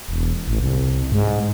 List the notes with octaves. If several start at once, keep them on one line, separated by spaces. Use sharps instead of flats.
E1
A1
C2
G#2